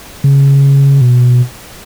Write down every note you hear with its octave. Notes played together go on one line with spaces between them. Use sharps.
C#3
B2